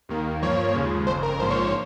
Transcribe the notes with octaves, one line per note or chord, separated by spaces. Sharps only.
D#2 D#3 A#3
G2 F3 A#3 C#5
D#2 C#3 F3 G#3
G1 F2 C#3 C5
A#4
A#1 G#2 F3 A#3 C5
C#5
C5